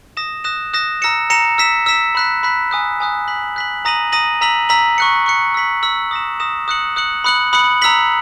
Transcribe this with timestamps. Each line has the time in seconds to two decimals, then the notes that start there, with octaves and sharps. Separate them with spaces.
0.17 D#6 A#6 E7
0.44 D#6 F#6 A#6 E7
0.73 D#6 F#6 A#6 E7
1.02 A#5 E6 A#6 C#7 E7
1.30 A#5 E6 A#6 C#7 E7
1.58 E6 B6 E7
1.86 E6 B6 E7
2.15 B5 F#6 B6
2.43 B5 F#6 B6
2.71 G#5 D#6 F#6
3.00 G#5 D#6 F#6
3.28 F#6 B6 F#7
3.56 F#6 B6 F#7
3.85 A#5 D#6 A#6 D#7 F#7
4.12 A#5 D#6 A#6 D#7 F#7
4.41 A#5 E6 B6 F#7
4.69 A#5 E6 B6 F#7
4.98 C#6 F#6 C#7
5.26 C#6 F#6 C#7
5.54 E6 B6 F#7
5.83 E6 B6 F#7
6.11 D#6 A#6 E7
6.40 D#6 A#6 E7
6.68 D#6 F#6 C#7 F#7
6.96 D#6 F#6 C#7 F#7
7.24 B5 D#6 F#6 C#7 F#7
7.53 B5 D#6 F#6 C#7 F#7
7.82 A#5 E6 B6 F#7